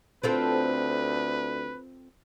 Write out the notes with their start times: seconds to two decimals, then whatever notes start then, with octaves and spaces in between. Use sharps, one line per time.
0.23 D2 C4 F4 A4 B4